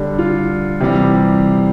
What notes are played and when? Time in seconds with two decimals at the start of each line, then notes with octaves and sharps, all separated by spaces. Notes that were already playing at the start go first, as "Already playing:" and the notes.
Already playing: D3 G3
0.19 F4
0.80 C3 E3 G3